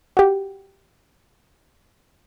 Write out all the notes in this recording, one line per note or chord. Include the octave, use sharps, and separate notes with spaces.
F#4 G4